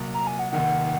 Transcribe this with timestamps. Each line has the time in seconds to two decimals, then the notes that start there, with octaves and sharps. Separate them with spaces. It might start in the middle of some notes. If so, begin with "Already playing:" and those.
Already playing: C2 A#2 F#3 A#3
0.14 A#5
0.27 G#5
0.39 F#5
0.51 F1 D#2 D#3 F#5